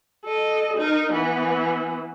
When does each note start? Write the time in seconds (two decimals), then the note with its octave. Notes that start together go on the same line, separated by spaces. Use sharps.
0.25 A4 D#5
0.77 D#4 A#4
1.12 E3 B3